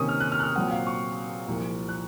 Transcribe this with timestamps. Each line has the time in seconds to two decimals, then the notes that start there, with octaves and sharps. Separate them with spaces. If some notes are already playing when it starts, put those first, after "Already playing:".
Already playing: C3 D#3 A#3 C#4 C#6 D#6
0.09 F6
0.20 F#6
0.32 F6
0.40 F#6
0.43 F6
0.55 A#2 F#3 C4 F#5
0.71 F5
0.87 C#6
1.48 C2 A#2 F3
1.89 F#6